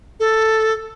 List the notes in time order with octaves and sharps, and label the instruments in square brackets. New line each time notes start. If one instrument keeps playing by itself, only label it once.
[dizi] A4